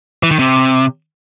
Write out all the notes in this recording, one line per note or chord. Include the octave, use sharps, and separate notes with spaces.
E3
D#3
C3